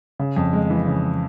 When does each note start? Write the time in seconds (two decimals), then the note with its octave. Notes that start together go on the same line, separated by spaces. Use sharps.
0.19 C#3
0.37 F2
0.53 G#3
0.70 E3
0.87 C#3